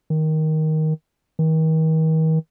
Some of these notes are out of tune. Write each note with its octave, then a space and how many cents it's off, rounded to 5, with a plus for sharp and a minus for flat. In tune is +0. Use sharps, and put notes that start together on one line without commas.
D#3 +10
D#3 +40